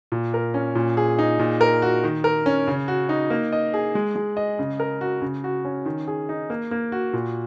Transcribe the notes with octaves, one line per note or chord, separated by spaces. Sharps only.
A#2
A#4
C#4
A#2
G#4
D#4
A#2
A#4
F#4
D#3
A#4
C#4
C#3
F#4
D#4
A#3
D#5
G#4
G#3
G#3
D#5
C#3
A#4
F#4
C#3
F#4
C#4
D#3
G#4
D#4
A#3
A#3
F#4
A#2